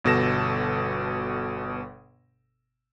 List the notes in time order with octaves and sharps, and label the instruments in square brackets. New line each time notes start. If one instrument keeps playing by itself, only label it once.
[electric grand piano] G1 B2 A4 A#6 E7